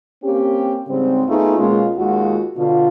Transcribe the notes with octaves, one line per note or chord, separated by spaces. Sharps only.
A#3 C4 C#4 G4
G#2 C#3 G3 C4
A3 B3 D#4 F4 G#4
B2 G#3 A#3 C#4 F4
D#2 G#3 F4 F#4
B2 D3 F4